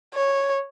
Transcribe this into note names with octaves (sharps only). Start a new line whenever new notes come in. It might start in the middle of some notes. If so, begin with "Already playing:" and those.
C#5